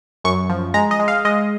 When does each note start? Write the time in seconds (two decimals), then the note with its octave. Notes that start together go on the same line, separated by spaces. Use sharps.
0.24 F#2 C#6
0.49 F3
0.74 G#3 A#5
0.91 D#5
0.99 G#3
1.08 F5
1.25 G#3 D#5